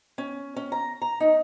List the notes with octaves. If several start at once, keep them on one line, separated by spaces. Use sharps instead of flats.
C#4
C#4
A#5
A#5
D#4